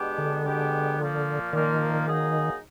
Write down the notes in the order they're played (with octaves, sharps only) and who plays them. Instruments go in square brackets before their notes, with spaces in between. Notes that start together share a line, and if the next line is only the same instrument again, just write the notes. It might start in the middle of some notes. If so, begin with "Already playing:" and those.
Already playing: [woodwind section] B2 G#3 B3 D4 G4
[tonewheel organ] D3
[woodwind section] B2 G#3 B3 D4 G4
A#2 F3 A#3
[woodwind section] A#2 F3 A#3 [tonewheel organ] D#3
[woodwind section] F#3 A#3 D#4 G#4